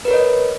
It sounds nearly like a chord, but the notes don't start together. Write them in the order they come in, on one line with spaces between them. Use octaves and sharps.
B4 A#4 C#5 D#5